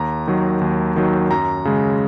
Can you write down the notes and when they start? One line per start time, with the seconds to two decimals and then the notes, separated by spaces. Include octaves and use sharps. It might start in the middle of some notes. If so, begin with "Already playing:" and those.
Already playing: D#2 A#5
0.27 D#3 F#3
0.61 D#2
0.96 D#3 F#3
1.31 F#2 A#5
1.65 C#3 G#3